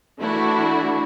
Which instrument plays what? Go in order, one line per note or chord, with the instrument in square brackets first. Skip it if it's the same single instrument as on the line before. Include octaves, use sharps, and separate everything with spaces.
[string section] E3 A3 D4 E4 F#4